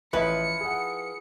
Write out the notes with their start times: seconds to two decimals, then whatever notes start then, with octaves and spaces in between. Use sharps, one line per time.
0.13 A1 F3 E4 B4 D#5 C#7
0.61 G#4 F#5